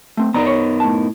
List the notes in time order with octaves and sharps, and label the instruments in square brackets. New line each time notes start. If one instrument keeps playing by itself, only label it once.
[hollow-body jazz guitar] A3 C4
[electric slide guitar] B3 D#4 A#4 [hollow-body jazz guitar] D5 A#5
[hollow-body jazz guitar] C#5
A2 A5